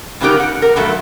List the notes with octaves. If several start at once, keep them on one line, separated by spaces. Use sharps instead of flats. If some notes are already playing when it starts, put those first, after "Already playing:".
G2 C#3 B3 D#4 G4 A#4
F#5
A#4
G2 A#2 F#3 A3